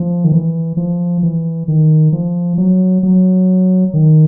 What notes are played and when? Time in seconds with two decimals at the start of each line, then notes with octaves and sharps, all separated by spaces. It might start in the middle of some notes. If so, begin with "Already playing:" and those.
Already playing: F3
0.24 D#3
0.32 E3
0.77 F3
1.23 E3
1.68 D#3
2.12 F3
2.58 F#3
3.03 F#3
3.94 D#3